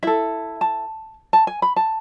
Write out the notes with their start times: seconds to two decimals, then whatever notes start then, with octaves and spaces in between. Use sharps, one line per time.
0.03 E4 A4 E5
0.61 A5
1.33 A5
1.47 G#5
1.62 B5
1.76 A5